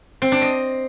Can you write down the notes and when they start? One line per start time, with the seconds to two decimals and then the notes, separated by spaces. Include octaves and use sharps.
0.22 C4
0.32 D4
0.42 D#5